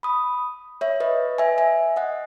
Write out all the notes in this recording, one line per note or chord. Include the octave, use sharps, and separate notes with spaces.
B5 D#6
C#5 E5
B4 D#5
E5 G#5
E5 G#5
D#5 F#5